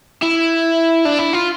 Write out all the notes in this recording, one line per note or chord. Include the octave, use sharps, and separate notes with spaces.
E4
D4
E4
F4